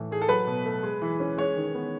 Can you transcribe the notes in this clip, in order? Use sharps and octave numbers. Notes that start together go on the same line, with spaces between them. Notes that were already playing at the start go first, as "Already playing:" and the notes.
Already playing: A2 E3
A3 G#4
A4
F#3 B4
B2
A3
G#3
E3
C#4
G#3 C#5
D#3
B3